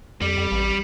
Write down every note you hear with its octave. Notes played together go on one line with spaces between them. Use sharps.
F2 G3
F2
A1